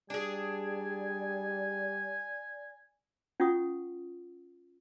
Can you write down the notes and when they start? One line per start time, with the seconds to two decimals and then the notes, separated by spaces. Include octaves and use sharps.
0.10 G3 D4 G#4 D5 G#5
3.40 C#4 F4 F#5 C#6 D#6